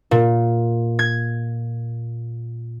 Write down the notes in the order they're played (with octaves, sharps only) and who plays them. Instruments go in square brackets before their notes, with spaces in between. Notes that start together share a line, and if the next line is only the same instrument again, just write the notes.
[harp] A#2
G#6